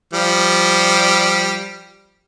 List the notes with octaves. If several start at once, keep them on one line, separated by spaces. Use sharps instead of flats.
F3 G3